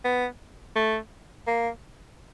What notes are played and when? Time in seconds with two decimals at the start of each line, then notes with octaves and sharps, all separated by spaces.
0.04 B3
0.76 A3
1.47 A#3